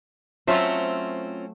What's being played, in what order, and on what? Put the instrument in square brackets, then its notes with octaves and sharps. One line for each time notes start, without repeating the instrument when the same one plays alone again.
[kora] F#3 A3 E5 [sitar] C4 C#4 F4